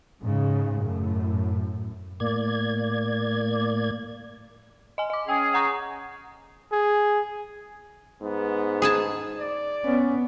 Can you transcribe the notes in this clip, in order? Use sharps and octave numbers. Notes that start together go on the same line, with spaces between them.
G#2 C#3 G#3
F#2 A2
A2 A#3 D5 G#6
D#5 G#5
D#5 D6
C#4 G#4 G5
F#5 A#5 C#6
G#4
G#2 B3
G#4 G#5 A5
D5
B3 C#4